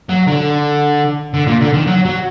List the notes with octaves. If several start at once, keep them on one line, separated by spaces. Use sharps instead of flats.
F#3
D3
D3
A#2
D3
D#3
F#3
F#3